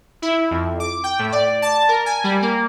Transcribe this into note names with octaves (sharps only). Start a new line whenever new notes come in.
E4
F2
D6
G5
A2
D5
A5
A#4
G#5
G3
A#3